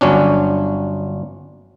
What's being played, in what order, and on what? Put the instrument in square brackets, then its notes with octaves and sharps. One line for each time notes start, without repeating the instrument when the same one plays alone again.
[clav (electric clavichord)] G1 F#3 C#4 D4